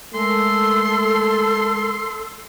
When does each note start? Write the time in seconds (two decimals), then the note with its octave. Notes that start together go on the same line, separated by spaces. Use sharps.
0.14 G#3 A3 A4 A#4 C6